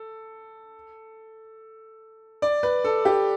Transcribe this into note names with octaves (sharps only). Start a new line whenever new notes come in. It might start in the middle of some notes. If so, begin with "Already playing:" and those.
Already playing: A4
D5
B4
A4
G4